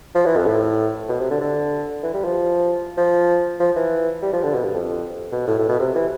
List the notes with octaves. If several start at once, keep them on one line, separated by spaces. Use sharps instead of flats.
F3
E3
F2
A2
B2
C3
D3
D3
E3
G3
F3
F3
F3
E3
G3
F3
D3
B2
G2
F2
B2
A2
A2
B2
C3
E3